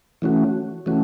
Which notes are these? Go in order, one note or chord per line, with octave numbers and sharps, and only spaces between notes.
E3 A3 C#4 F#4
E3 A3 C#4 F#4